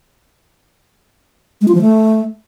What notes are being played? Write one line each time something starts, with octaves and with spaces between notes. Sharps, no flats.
G#3
F4
F3
A3